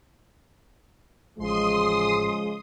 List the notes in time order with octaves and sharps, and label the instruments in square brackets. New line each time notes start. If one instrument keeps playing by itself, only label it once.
[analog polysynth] A1 [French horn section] C#3 F3 G#3 [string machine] C6 D#6